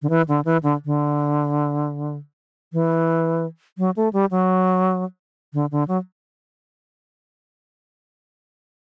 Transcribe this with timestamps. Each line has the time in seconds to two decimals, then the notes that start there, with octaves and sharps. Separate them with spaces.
0.02 D3
0.10 E3
0.28 D3
0.45 E3
0.63 D3
0.85 D3
2.73 E3
3.78 F#3
3.96 A3
4.13 G3
4.31 F#3
5.54 D3
5.71 D3
5.88 F#3